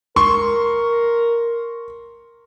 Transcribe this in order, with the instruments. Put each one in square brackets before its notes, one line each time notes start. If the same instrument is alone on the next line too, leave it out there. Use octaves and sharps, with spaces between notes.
[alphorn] A#4 [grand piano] C6 C#6